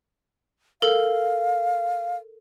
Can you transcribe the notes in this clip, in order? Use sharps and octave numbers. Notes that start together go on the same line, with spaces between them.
A4 A#4 F5